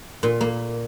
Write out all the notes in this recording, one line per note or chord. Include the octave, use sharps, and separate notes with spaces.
A#2
A#3